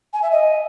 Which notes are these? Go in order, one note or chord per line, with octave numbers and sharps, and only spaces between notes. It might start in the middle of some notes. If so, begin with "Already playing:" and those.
G#5
E5
D#5